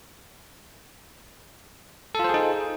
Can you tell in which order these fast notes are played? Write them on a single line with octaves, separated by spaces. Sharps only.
A4 F4 C5 G#4 D#4